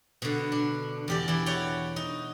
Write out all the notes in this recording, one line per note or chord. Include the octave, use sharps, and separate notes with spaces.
B2 D3
D4
E2 G4 D5
E3 E4
F#4 C#5 D5 G5
D#4